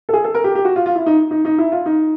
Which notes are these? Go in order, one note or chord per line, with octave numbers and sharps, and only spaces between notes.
A4
G#4
A4
A#4
G4
G4
F#4
F4
F4
E4
D#4
D#4
D#4
E4
F4
D#4